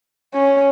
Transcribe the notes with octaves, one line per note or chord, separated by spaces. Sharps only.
C#4